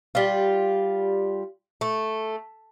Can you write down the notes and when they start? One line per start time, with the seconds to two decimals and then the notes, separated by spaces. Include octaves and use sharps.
0.15 G3 F4
1.81 A3